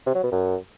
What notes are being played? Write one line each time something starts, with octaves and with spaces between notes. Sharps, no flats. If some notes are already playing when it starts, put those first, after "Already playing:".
C3
F#3
B2
F#2